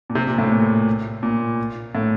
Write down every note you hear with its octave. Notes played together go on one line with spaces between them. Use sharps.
A#2
C3
A#2
A2
A#2
A#2
A2